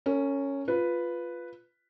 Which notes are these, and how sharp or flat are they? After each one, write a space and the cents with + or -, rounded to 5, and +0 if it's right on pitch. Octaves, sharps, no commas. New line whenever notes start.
C#4 +0 A#4 -40
F4 +0 B4 +0